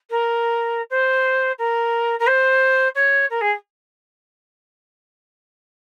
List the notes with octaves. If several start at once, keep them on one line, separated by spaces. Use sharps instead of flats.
A#4
C5
A#4
A#4
C5
C#5
A#4
G#4